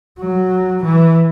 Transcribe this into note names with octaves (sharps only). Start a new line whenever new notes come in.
F#3
E3